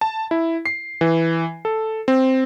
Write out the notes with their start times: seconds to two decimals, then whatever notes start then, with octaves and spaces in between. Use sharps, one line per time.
0.01 A5
0.31 E4
0.65 C7
1.01 E3
1.65 A4
2.08 C4